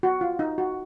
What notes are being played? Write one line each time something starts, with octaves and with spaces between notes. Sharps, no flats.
F#4
F4
D#4
F#4